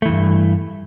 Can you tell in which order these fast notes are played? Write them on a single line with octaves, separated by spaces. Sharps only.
A3 E3 E2 G2